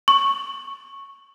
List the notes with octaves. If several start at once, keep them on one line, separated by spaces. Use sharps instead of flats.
C#6